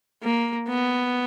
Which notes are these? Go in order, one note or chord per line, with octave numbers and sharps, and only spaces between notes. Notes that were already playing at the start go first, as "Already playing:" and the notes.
A#3
B3